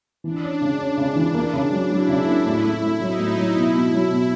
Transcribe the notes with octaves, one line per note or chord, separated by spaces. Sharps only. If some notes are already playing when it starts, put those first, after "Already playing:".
E3 D4
C#4
C#3
C#4 D4
C#3
E3
A#3
C#3
F#3
F#3 E4
C#3
A#3
A2 E4
A3
A3
F#3 D#4
A2
F#3
B2 E4
B2
F#3
B2